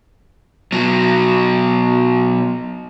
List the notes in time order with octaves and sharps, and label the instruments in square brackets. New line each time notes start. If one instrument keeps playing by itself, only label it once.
[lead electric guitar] B2 F#3